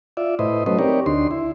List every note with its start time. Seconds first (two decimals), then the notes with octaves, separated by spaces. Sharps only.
0.17 F4 D5 E5
0.39 A2 E4 B4 C5 D#5
0.66 F#3 A3 C#4 B4 C5 D#5
0.79 C4 D#4 G4 A#4 C#5 D5
1.06 D2 D4 D#4 C6
1.31 E4